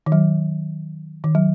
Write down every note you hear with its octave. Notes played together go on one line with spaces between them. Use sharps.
D#3
F#3
D#3
F#3